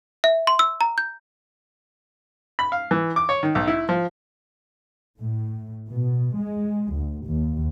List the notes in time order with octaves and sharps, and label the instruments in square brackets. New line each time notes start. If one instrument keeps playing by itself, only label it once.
[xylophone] E5
C6
E6
A#5
G6
[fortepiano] B5
F5
E3
D6
C#5
D#3
B1
E4
F3
[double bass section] A2
B2
G#3
D2
D#2